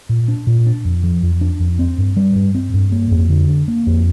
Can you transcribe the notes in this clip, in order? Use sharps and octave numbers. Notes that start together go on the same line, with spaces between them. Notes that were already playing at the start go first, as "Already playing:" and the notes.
A#2
D4
A#2
D4
F2
F3
F2
D4
F2
C4
G2
G3
G2
C4
G2
A#3
F2
D3
D4
A#3
F2